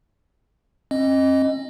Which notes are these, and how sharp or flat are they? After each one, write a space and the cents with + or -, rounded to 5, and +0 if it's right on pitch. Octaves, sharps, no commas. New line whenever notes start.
C4 +45 D#5 +0